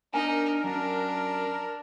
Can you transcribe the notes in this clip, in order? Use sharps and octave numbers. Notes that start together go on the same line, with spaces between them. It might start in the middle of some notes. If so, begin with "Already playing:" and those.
D4 D#4 A#4 G#5
F#2 D4